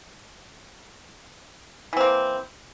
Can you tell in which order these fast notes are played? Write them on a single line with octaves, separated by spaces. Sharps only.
E3 C4 A#3